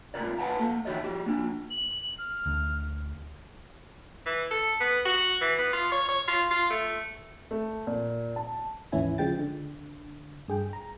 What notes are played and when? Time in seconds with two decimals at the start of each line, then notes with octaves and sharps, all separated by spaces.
0.14 C2 G#2 F4 A#4 D5
0.39 B4 F5 F#5 G#5 A5
0.59 A#3 A4
0.85 D#3 E4 F#4 C#5 D#5
1.04 G3 F#4 G4
1.26 A#3 D4
1.70 F#7
2.19 F6
2.46 D2
4.26 E3
4.51 A4
4.80 B3
5.05 F#4
5.41 E3
5.58 B3
5.73 F4
5.92 C#5
6.09 C#5
6.28 F4
6.51 F4
6.70 A3
7.51 A3
7.87 A#2
8.36 A5
8.92 D#2 G#2 E3 C#4 E4 G#5
9.18 C#3 F3 G#3 G5 A6
9.39 D3
10.48 G2 G#4 G5
10.73 A#5